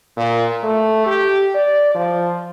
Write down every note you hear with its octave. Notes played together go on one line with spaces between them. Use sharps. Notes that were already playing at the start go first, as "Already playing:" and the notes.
A#2
A3
G4
D5
F3